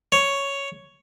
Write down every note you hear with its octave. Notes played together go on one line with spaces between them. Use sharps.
C#5